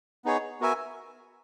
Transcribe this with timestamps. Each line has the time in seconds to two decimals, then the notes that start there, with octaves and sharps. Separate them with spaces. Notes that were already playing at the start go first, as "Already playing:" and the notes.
0.25 B3 D#4 G#4 C#5
0.60 B3 F#4 A#4 E5 G#5